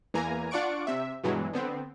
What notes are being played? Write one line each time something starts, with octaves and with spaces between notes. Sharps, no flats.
E2 E3 A#3 G#5 A#5
D4 F4 D5 F#5 C#6 D7
C3 E5
G2 B2 E3 F#3 G#3
D3 B3 C4